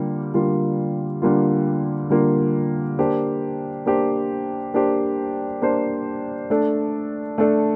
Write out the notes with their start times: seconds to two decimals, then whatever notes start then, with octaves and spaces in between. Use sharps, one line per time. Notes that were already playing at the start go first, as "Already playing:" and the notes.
Already playing: D3 G3 A#3 F4
0.34 D3 G3 A#3 F4
1.22 D3 G3 A#3 F4
2.10 D3 G3 A#3 F4
2.99 A#3 D4 G4 C5
3.86 A#3 D4 G4 C5
4.74 A#3 D4 G4 C5
5.62 A#3 D4 G4 C5
6.50 A3 D4 A4
7.38 A3 D4 A4